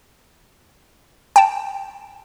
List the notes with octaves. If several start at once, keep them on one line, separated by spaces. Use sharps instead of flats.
G5 A5